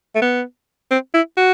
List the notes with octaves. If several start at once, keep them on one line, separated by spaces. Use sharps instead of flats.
A3
B3
C4
E4
F#4